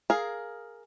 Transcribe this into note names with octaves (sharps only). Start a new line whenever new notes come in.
G#4 A#4 F5